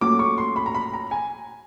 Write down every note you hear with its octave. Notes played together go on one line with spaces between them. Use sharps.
A#2 F#3 A3 C#4 D6
C#6
C6
B5
A#5
B5
A#5
G#5